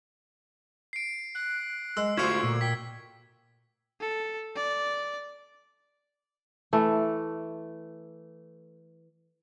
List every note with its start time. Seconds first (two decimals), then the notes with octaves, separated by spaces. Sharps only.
0.93 C7 D7
1.35 F#6
1.97 G#3 E6
2.17 D2 E4 F4 G4 C5 C#6 G#6
2.43 A#2
2.61 G5 B6
4.01 A4
4.56 D5
6.73 E3 A3